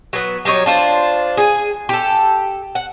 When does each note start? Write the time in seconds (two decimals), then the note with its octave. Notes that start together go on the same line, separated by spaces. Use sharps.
0.13 F#3 B3
0.45 F#3 G3 D#4 C#5
0.66 D4 F4 C5
1.37 G#4 G#5
1.89 G4 A4
2.75 F#5